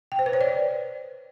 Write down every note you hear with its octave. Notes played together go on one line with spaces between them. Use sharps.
G5
C5
B4
C#5
D5